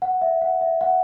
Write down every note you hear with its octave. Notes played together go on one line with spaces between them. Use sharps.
F#5
E5
F#5
E5
F#5